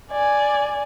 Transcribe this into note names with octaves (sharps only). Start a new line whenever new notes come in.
D5 G#5